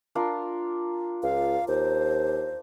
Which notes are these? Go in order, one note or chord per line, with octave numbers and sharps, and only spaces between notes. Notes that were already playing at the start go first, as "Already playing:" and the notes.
D4 F4 A#4
C#2 F5
D#2 C5